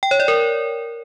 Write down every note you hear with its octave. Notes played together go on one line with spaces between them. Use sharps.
G5
C#5
D5
A#4